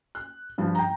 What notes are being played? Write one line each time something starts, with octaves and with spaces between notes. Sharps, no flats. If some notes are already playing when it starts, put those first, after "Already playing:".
F#6
G2 F3
G5 A#5